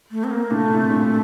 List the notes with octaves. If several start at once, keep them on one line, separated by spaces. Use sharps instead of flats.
A3
C4
A#3
A#2 D3 A3
D3
A2 C3
G2 A#2